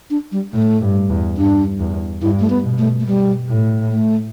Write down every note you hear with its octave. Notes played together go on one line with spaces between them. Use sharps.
D4
G3
A2 A3
G2
E2
G2 D4
E2
G2 E4
A3
B3
B2
A3
A3
B2 G3
A2
A3